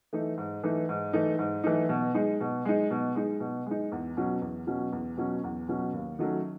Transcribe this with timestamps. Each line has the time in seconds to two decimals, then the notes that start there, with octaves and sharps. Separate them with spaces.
0.13 E3 A3 D#4
0.38 G#2
0.64 E3 A3 D#4
0.89 G#2
1.13 E3 A3 D#4
1.39 G#2
1.64 E3 A3 D#4
1.89 B2
2.14 G#3 D#4
2.41 B2
2.65 G#3 D#4
2.91 B2
3.15 G#3 D#4
3.40 B2
3.66 G#3 D#4
3.92 E2
4.17 B2 F#3 C#4
4.42 E2
4.67 B2 F#3 C#4
4.92 E2
5.17 B2 F#3 C#4
5.44 E2
5.68 B2 F#3 C#4
5.93 D#2
6.19 D#3 F#3 A3 C#4